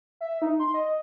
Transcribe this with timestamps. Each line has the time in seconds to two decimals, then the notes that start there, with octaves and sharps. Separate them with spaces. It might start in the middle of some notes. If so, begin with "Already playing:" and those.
0.21 E5
0.42 D#4
0.60 C6
0.74 D#5